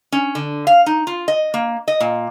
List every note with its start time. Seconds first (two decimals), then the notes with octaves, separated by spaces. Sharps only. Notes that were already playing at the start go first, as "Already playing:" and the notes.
0.12 C#4
0.35 D3
0.67 F5
0.86 D#4
1.07 F4
1.28 D#5
1.54 A#3
1.88 D#5
2.00 A#2